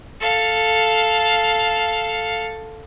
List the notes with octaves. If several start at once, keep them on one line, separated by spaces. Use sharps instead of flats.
A4 F5